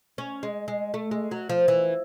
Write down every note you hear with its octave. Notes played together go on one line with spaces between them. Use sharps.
C#4
G#3
G#3
A3
G#3
F#3
F3
E3